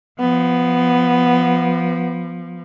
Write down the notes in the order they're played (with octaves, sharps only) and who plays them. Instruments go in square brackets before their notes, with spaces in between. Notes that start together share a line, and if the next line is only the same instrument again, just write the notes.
[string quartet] F3 [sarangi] B3